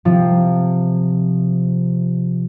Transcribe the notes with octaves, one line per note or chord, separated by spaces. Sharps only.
C3 F3